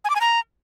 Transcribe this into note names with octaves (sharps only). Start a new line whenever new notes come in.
G#5
D6
G#5
A#5